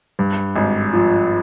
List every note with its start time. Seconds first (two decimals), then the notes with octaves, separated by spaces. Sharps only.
0.19 G2
0.56 G#1
0.93 F3